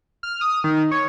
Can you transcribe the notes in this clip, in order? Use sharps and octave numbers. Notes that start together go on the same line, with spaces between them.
F6
D#6
D#3
C#5